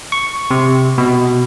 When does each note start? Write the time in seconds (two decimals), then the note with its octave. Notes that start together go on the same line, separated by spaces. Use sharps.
0.12 C#6
0.51 C3
0.98 B2